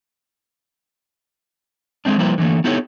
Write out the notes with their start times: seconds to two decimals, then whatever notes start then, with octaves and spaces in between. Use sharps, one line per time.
2.05 G#3 A3 C4 D4
2.18 F3 G3 A#3 E4 B4 C5
2.38 D3 E3 A3 A#3
2.64 B3 D#4 E4 G4 A4 C#5